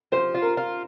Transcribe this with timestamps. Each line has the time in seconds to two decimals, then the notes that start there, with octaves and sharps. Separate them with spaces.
0.12 F3 C5
0.35 F4
0.42 A#4
0.57 F4